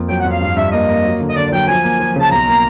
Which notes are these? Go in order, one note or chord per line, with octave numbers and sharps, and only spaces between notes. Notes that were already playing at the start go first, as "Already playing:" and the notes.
Already playing: F2 A#3
F#3 G5
F#5
F2
F5
G2 F5
G2 E5
A#3 D#5
A#3
F#3
D3
D#5
D3 D5
F#3 G5
F3 G#5
A#3
F3
C#3 A5
B1 A#5
A#3